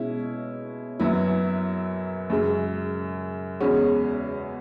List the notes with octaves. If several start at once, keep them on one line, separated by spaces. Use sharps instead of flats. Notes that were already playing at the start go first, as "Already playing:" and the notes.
Already playing: B2 G#3 C#4 E4
F#2 F#3 B3 E4
F#2 C#3 G#3
E2 C#3 G#3 C#4 F#4